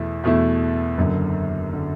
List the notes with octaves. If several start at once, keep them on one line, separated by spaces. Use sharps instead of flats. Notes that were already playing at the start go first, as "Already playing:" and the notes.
Already playing: E2 B2 A3 E4
E2 B2 A3 E4
F#1 F#2 D3
D3